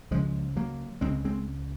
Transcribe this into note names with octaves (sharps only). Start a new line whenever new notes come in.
C#2 C#3 F3 G#3
F#3 A#3
C#2 C#3 G#3 C4
G#3 C4